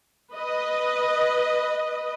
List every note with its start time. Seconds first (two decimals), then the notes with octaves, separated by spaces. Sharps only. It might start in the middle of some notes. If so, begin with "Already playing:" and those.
0.33 B4 D#5